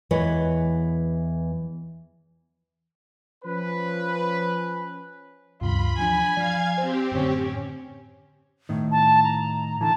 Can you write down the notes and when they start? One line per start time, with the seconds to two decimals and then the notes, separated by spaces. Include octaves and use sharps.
0.11 E2 E3 G#3 B4 C#5
3.45 F3 C#4 B4
5.61 D2 G2 C3 F4 B5
5.97 E3 F3 D4 G#5
6.36 F3 D5 F5 G#6
6.78 C4 G4 C5
7.12 F#2 A2 D3 C#4
8.69 A2 D#3
8.91 A5
9.24 A#5
9.81 D3 E3 A5